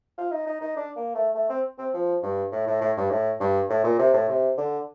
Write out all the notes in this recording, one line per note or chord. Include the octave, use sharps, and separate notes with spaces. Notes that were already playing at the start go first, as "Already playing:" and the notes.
F4
D#4
D#4
D#4
D4
A#3
A3
A3
C4
C4
F3
G2
A2
A2
A2
G2
A2
G2
A2
A#2
C3
A2
C3
D3